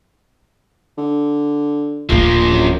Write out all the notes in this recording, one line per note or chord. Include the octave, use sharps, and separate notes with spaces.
D3
D1 A2 F3 A#3
F#2